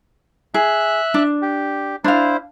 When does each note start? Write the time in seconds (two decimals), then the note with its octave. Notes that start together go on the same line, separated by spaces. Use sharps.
0.54 G#4 E5 F#6
1.14 D4
1.42 G4
2.04 D4 E4 C5 F5